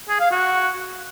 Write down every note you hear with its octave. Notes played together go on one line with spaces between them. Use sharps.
G#4
F5
F#4